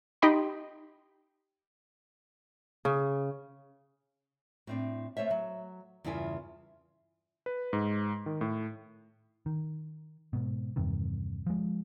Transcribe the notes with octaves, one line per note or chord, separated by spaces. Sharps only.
D#4 G4 D#5 G5 B5 C6
C#3
A2 C4 D4
A3 C5 C#5 E5
F#3
E2 G2 C#3 E4 F4 G#5
B4
G#2
D#3
A2
D#3
G#2 B2
E2 G2 C3 D#3
F3 G#3